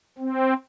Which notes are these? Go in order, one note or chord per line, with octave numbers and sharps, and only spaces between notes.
C4